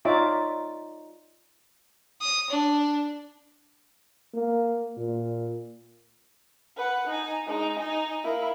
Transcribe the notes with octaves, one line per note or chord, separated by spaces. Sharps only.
D#4 F4 C#5 D5 E5 D6
D#6
D4
A#3
A#2
B4 F#5
D#4 G#5
G#3 D#4
D#4 G#5
A#3 E4